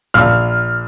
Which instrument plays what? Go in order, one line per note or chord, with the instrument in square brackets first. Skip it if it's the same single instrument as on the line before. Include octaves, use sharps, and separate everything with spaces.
[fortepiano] A#1 F5 E6 [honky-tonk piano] F6